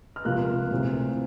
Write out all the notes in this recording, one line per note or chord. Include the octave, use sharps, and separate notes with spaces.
F6
C#2 C3 F3 A#3 F#6
D2 C3 E3 A3 C4